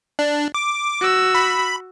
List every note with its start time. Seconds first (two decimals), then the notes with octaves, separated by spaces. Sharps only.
0.19 D4
0.54 D6
1.01 F#4 E6
1.35 B5